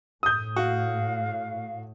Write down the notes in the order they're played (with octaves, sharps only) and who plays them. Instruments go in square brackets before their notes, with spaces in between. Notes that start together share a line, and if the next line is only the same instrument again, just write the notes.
[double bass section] A2 [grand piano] D#6 G6
[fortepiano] F#4 [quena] F5